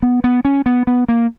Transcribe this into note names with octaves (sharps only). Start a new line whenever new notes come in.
B3
B3
C#4
B3
B3
A#3